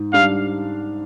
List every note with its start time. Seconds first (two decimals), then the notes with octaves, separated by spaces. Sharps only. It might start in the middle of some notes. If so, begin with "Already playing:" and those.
Already playing: G#2
0.13 G3 D4 F5